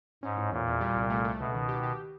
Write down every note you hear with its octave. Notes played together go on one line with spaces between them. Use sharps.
G#2 C#4
A2
E2 A#2
E2
G3
C2
A3
A3
C#2 B2
D#3
G4
G4